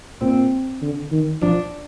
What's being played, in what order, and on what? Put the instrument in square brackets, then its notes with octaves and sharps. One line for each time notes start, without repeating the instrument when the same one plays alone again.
[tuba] A#2 [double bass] C4
[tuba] D3
D#3
[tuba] F3 [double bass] D4